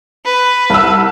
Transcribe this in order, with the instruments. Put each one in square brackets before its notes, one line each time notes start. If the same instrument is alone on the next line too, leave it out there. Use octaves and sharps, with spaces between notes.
[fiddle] B4
[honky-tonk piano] C2 E6